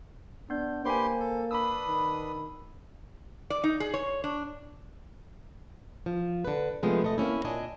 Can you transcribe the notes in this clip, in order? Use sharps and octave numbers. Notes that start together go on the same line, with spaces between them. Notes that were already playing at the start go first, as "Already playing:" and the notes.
B3 D4 G6
A#3 G4 B4 C5 G#5 C6
A4
D4 B4 B5 D#6 E6
D#3
D5
D#4
G#4
C#5
D4
F3
D3 B4
C3 F3 G#3 A3 B3
A3 D#5
A#3 C4 C#4 E4
A#2 D4 D#5 G#5